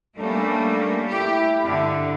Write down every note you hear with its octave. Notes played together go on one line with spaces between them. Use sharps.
G3 A3 A#3 C#4 D4 A4
E4 G4
G2 D3